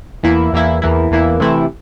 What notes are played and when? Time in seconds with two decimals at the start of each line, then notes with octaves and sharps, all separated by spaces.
0.23 E2 E3 A#3 E4
0.53 E2 E3 A#3 E4
0.82 E2 E3 A#3 E4
1.11 E2 E3 A#3 E4
1.40 C3 E3 A3 C4 E4